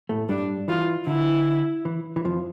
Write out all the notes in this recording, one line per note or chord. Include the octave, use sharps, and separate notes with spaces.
A2 A3
G2 G3 D4
E3 F4
D3 E4
E3
E3
F2 F3